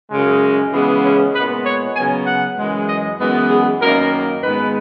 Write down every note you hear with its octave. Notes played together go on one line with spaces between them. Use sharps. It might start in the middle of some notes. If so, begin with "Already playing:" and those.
F#2 C#3 G#3
C#3 E3 G#3 B3
C#4
A#2 G#3 B3 B4
C#5
C#3 F#3 B3 G#5
F#5
F#2 E3 G#3
D#5
F#2 E3 G#3 B3
G#4
F#2 D#3 A#3 A#4
G#2 D#3 G#3 B3 B4